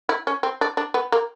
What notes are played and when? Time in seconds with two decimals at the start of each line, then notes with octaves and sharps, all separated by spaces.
0.09 E4
0.27 C#4
0.43 C4
0.61 D4
0.77 D4
0.94 B3
1.12 A#3